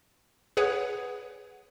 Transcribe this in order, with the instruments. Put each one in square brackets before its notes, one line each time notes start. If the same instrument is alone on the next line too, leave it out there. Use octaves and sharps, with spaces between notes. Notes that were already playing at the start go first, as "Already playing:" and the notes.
[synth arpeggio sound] G#4 B4 C#5 F#5